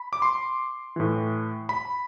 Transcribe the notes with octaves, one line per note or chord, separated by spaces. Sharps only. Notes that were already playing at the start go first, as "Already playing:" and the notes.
Already playing: B5
D6
C6
A2 E3
B5